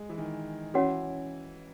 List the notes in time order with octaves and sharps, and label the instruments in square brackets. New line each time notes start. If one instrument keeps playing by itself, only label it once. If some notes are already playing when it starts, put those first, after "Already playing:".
Already playing: [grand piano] G#3
E3
D#3
[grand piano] E3 [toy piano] C#4 F#4 C#5 F#5